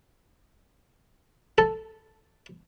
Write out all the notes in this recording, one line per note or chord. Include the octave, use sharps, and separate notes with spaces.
A4